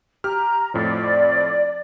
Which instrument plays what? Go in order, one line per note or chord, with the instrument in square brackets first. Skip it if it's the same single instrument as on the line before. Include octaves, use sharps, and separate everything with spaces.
[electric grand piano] G4 F6 [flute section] A#5
[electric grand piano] F2 A2 F3 [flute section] D5